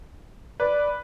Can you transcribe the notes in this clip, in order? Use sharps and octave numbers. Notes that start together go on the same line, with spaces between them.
B4 D5